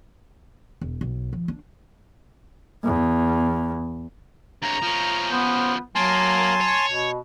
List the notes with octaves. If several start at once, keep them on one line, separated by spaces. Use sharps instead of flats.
E1
B1
F3
D4
E2
G2 C#5 A#5
F3 C#4
B3 C5
F#3 A#3 G#5 A5 C6
C#5
B2